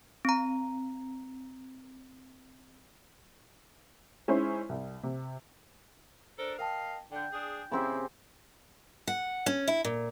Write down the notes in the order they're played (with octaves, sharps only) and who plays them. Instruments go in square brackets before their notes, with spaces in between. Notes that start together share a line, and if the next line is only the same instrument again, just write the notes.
[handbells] C4 A#5
[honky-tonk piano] G#3 C#4 D#4 E4 C5
C2
C3
[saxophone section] D4 A4 A#4 [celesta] C5
[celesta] A#4 G5 A5 [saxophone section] D#5 F5
[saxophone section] D3 [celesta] G5 G6
[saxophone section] D4 G#4
[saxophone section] A#2 E4 [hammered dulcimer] C#3 C4 G4
[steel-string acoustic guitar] F#5
C#4
E4
A#2